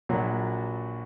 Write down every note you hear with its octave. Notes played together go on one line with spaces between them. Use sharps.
A#1 A#2 F#3 F#4